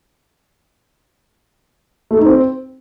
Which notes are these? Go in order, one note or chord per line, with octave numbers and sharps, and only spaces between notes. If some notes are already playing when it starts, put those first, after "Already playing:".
A3
D#4
C4